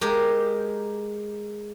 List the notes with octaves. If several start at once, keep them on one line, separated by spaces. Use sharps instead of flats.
G#3 G4 A#4